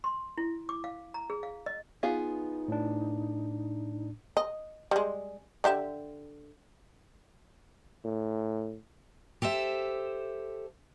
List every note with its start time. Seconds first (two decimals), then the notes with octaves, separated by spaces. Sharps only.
0.04 C6
0.38 E4
0.69 D6
0.84 F5
1.14 A#5
1.30 G#4
1.43 F5
1.66 D#5
2.03 B3 D#4 F4 G#4
2.68 A2 D4
4.37 D#5
4.91 G3 G#3
5.64 D3 G4 E5
8.04 A2
9.42 G4 A4 C5 E5